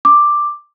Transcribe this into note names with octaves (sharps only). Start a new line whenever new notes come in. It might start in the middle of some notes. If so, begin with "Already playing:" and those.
D6